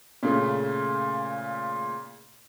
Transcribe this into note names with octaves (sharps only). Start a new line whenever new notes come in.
A#2 C#3 A3